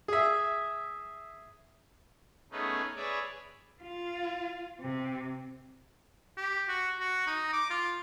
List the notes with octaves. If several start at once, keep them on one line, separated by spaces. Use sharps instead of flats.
G#4 E5
A3 B3 C#4 D#4 G#4 B4
G#4 B4 C#5 D5 E5
F4
C3
G4
F#4
F#4
D#4
D6
F4